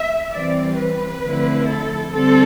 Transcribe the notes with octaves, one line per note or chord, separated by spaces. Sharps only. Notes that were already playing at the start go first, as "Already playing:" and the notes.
Already playing: E5
E3 G3 C4 D5
B4
D3 F3 A3 C4 E4
A4
D3 G3 C4 A4